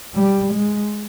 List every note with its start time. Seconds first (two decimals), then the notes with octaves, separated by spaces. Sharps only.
0.15 G3
0.52 G#3